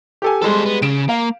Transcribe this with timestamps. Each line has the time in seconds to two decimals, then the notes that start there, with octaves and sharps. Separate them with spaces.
0.22 G4 A4 G#5
0.42 G3 G#3 A4 C5
0.66 B3
0.82 C#3 D7 E7
1.09 A#3 F5